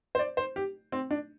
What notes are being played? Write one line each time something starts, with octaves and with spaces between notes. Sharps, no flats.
C5
D5
C5
G4
C4
D4